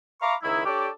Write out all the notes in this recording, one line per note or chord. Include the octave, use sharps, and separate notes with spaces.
E5 F5 A#5 B5 C#6 D6
C#2 D#3 D#4 E4
D4 G4 A4 C#5 D5